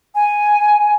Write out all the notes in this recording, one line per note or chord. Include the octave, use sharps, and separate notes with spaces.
G#5